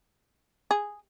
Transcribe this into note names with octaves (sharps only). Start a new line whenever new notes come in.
G#4